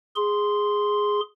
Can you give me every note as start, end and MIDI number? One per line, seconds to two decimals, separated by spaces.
0.16 1.21 68
0.16 1.21 84